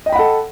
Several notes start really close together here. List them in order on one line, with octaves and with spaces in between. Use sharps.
D#5 G5 B5 F#5 A4